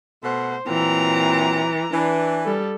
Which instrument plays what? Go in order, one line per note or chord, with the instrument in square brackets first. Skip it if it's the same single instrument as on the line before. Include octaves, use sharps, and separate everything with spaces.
[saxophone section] B2 A3 F#5 [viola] C5
[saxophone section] A#2 F#3 C4 [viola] E3 A#5
[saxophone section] E3 [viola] D4
[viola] G3 A4